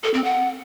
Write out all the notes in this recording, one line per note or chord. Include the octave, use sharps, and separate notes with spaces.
A4
C4
F#5